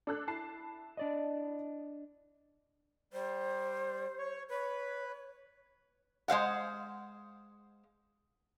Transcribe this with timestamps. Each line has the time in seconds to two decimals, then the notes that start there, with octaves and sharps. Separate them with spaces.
0.07 D4 A4 F#6
0.28 E4 A5 C7
0.97 D4 D5 D#5
3.13 G3 C5
4.19 C#5
4.50 B4 C#5
6.28 G#3 C5 F5 F#5